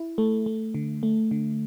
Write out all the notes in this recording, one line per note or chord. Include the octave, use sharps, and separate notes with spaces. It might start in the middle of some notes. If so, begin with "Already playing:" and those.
Already playing: E4
A3
A3
D3
A3
D3